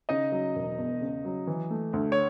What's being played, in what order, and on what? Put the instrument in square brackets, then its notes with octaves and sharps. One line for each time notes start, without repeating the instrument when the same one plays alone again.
[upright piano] C#3 [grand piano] D#4 D#5
[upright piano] F#3
E1
E2
C#3
F#3
E3
A3
D2
[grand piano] C#5